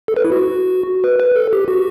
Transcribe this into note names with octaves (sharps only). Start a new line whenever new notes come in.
A4
B4
E4
F#4
B4
B4
A4
G4
F#4